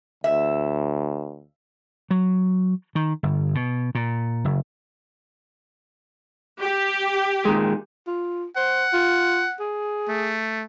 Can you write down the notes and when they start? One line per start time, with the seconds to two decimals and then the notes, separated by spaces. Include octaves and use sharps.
0.24 D2 E5
2.11 F#3
2.95 D#3
3.23 G1
3.55 B2
3.95 A#2
4.45 F#1
6.60 G4
7.45 A#2 D#3 G#3
8.07 F4
8.57 C5 F#5
8.93 F4
9.60 G#4
10.09 A3